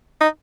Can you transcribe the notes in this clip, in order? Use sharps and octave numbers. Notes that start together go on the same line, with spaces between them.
D#4